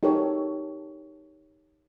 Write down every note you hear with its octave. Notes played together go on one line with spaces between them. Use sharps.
D#4 G4 A4 A#4 C#5